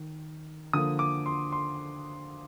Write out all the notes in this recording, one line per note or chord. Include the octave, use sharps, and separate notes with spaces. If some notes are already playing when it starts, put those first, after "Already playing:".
Already playing: D#3
D3 F3 A#3 D#6
D6
C6
C6